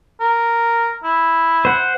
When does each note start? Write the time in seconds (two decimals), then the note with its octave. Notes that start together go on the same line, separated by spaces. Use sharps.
0.21 A#4
1.04 E4
1.65 C5 F#5